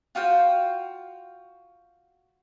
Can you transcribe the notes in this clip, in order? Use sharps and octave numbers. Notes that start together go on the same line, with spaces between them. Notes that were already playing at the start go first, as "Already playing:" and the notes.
F4 F#4 F5 G5